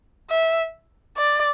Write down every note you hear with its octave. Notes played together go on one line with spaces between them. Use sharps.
E5
D5